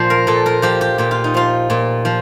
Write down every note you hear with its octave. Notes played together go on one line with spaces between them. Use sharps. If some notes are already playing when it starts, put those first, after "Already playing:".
Already playing: A#2 F3 C5 D5
A#4
A#2 A4
A#4
F3 G4
G4
A#2 G4
F4
D#4
F3 F4
A#2
F3